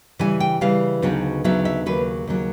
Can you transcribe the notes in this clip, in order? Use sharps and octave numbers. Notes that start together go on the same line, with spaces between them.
C#3 E3 G3 G#5
G5
C#3 E3 G3 F5
D2 C#3 F#3 B3 D#4
D2 C#3 F#3 B3 D#4 E5
E5
D#2 C#3 F#3 B4
D#2 C#3 F#3